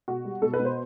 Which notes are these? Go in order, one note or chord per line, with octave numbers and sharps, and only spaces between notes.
B2 F#4
G3
B2 A4
B4
B2
C5